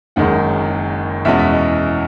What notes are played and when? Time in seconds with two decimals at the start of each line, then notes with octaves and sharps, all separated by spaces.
0.16 F#1 F#2 D#3 G#3 F#5
1.25 E2 B2 G#3 C#4 E4 E5
1.39 E5
1.52 D#5